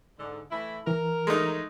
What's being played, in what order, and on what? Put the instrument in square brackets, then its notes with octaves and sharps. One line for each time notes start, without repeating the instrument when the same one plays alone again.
[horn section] G#2 D3
E3 A3 E4
[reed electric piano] E3 [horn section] A#4
[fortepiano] G#3 A3 D#4